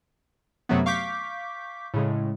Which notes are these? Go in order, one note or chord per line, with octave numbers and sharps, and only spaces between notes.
F#2 C3 F#3 A3 B3
F5 C#6 D6 G6 B6
A2 C#3 G#3